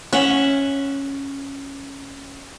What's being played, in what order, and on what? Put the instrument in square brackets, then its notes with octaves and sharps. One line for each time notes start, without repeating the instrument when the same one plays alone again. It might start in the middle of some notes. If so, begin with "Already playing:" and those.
[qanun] C#4 E5 F#5